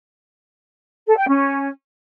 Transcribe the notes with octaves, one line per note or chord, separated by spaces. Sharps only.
A4
G5
C#4